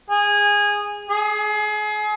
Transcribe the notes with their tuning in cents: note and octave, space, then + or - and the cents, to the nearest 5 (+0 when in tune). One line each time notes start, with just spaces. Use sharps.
G#4 -15
G#4 +30